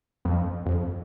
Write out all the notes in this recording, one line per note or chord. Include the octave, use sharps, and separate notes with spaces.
F2
F2